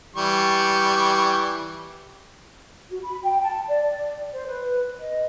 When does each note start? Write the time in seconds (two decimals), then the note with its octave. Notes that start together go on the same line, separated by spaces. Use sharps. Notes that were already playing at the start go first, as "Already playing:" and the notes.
0.16 E3 G3 C#6
2.90 F#4
3.04 B5
3.24 G5
3.42 A5
3.69 D5
4.32 C5
4.47 B4
4.98 D#5